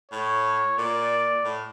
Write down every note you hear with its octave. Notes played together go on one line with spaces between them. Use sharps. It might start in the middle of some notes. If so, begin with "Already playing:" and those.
A2 C#5
A#2 D5
A2